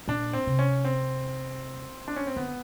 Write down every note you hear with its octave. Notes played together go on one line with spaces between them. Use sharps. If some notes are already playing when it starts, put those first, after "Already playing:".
A#2 D4
C4
C3
C#4
C4
D4
C#4
C4
D3 B3